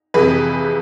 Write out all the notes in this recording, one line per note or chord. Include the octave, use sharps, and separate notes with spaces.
F2 C3 E3 G#4 B4